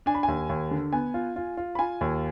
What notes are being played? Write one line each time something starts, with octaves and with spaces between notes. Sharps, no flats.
D4 G#5
B5
D#2 G#5
D#2
D3
B3 G#5
F4
F4
F4
B5
F4 G#5
D#2